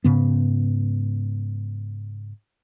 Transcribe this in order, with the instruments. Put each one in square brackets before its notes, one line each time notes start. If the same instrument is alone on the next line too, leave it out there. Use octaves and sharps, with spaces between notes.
[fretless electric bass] G#2 C#3 B3